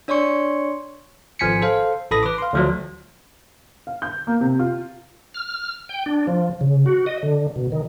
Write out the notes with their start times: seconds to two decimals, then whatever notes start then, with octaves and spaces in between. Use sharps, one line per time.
0.08 D4 C#5 D5 C6 C#6 C#7
1.39 G#1 F3 G#5 B6 C#7
1.62 A4 C5 F5
2.11 A1 A4 B5 D#6 A#6
2.23 B4 D6
2.38 F5 C6
2.53 D2 F3 F#3
3.87 F5
4.02 G6
4.27 A#3
4.41 C3
4.59 F4
5.34 F6
5.89 G5
6.06 D4
6.27 F3
6.61 C#3
6.86 F#4
7.06 D#5
7.23 D3
7.56 B2
7.72 D#3